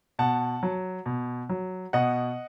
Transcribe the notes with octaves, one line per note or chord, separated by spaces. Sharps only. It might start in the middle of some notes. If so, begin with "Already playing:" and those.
B2 F#5 A5
F#3
B2
F#3
B2 D#5 F#5